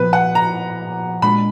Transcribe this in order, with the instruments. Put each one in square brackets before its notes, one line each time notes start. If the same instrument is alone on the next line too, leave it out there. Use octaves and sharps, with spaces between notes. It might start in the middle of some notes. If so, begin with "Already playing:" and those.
Already playing: [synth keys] A#2 F3 B3 [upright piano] B4
[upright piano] F#5
A#5
[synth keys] A#2 G#3 D4 [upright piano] B5